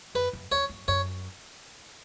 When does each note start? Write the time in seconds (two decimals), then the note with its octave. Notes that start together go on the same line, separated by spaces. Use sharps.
0.15 F#2 B4
0.33 F#2
0.51 E2 C#5
0.69 F#2
0.88 F#2 C#5